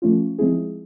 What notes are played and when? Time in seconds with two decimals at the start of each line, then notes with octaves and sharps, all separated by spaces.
0.02 F3 A3 C#4 F4
0.39 F3 G#3 C4 E4 G#4